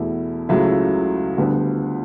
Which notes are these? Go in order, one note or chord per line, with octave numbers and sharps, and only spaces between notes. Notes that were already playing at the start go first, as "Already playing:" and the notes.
Already playing: E2 B2 A3 E4
C#2 C#3 F#3 A3 E4
D2 D3 G3 B3